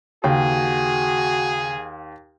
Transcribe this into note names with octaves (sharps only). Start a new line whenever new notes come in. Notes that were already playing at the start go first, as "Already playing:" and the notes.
D#2 C#3 F#4 G#4 F5 G5